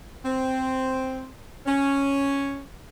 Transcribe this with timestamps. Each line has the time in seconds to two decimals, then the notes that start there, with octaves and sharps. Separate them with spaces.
0.24 C4
1.66 C#4